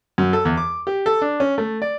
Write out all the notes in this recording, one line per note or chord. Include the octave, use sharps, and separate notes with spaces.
F#2
A4
E2
D6
G4
A4
D4
C#4
A3
D5